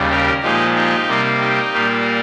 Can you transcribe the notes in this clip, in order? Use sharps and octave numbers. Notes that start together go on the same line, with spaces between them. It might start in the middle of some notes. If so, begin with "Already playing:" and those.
Already playing: D#2 C#3 G3
G4 A#4
A#2 F3 G#3 D#4 G4
D#4 G4
C3 G3 A#3
D#4 G4
A#2 G3 A#3